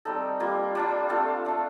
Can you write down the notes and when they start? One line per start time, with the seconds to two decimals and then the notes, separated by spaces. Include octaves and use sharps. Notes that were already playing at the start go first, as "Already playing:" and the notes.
0.05 G3 C4 D#4 A4
0.40 G3 A#3 F4
0.75 G3 D4 F4
1.09 A3 C4 F4 A4
1.45 A3 D4 F4